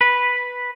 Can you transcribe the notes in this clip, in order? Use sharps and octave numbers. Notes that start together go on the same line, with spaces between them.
B4